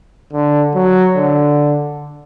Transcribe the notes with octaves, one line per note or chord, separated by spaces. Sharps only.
D3
F#3
D3